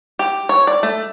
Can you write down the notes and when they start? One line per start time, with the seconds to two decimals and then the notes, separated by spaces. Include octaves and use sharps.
0.19 G4
0.49 C#5
0.67 D5
0.83 A3